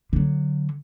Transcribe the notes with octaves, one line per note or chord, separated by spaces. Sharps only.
D3 F#3